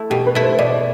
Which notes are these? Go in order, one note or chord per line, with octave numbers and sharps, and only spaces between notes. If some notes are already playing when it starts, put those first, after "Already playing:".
Already playing: A3 E4
B2 G4
B4
A3 E4
C5
B2 D5